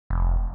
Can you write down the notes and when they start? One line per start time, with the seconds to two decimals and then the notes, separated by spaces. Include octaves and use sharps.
0.10 F1